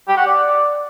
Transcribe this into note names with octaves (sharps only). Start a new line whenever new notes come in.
G4
F#5
D5